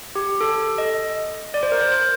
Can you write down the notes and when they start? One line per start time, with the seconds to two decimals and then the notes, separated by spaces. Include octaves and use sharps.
0.15 G4
0.41 A4
0.78 D#5
1.54 D5
1.63 C5
1.72 A#4
1.81 C5
1.92 C5